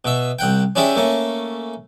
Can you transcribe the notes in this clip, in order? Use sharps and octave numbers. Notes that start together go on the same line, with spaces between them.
B2 E5
C2 F#5 G5
C#4 D4 E4 G4 G#4
A3 A#3 C#4